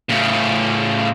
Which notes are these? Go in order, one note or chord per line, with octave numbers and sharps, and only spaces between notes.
A2 C#3